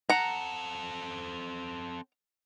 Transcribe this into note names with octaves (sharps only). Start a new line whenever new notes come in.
C4 A4 F#5 A#5